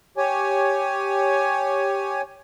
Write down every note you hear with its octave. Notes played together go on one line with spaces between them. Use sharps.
G4 C#5 G#5